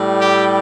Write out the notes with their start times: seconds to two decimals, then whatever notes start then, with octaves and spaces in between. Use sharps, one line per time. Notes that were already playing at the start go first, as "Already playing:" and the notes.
Already playing: A2 G3
0.18 G4